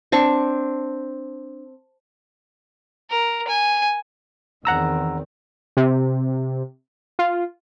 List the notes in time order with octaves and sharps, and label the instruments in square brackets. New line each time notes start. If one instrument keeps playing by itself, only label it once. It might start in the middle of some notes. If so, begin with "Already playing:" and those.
[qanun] C4 D4 C#6
[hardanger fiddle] A#4
G#5
[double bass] E2 C4 [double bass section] D#3 [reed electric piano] F#5 A#5 E6
[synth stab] C3
F4